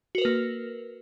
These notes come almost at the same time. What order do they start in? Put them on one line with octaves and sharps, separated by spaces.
F#4 A#4 B4 A#3